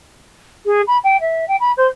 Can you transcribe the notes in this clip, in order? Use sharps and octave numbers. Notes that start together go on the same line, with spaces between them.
G#4
B5
G5
E5
G5
B5
C5